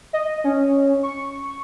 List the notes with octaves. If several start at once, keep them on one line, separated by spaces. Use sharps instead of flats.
D#5
C#4
C#6